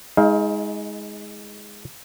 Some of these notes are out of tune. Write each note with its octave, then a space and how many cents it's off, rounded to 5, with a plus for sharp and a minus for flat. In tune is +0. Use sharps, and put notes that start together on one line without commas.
G#3 +0 D#4 +35 F5 +0